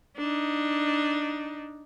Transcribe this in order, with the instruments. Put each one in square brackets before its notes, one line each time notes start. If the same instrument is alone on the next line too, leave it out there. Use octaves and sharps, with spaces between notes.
[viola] D4 D#4